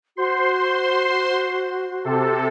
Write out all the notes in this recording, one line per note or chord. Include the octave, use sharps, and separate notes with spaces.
F#4 C5 C6
C3 A4